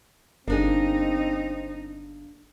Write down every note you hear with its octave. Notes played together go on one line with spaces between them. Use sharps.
G1 A#3 C4 D4 D#4 G#4